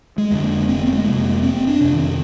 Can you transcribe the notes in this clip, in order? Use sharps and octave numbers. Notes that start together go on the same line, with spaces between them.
G#3
F2 D3
A#3
F1 C4
A#3
G#3
F2 C3
A#3
F1 C4
D4
F2 C3
D#3